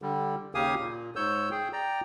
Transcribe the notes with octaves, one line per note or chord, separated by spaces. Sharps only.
D3 G3
D#2 C#3 G4 F5 G#5 D#6
A#2
G#2 C#5 E6 G6
G#4 G5
D5 G5 A#5